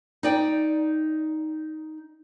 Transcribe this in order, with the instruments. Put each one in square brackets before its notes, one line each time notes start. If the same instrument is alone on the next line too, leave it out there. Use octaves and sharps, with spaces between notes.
[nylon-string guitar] D#4 D5 G5